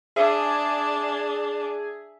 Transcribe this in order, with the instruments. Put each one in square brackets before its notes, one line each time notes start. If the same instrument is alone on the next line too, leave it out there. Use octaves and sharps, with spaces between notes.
[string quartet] D4 [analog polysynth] G#4 [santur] E5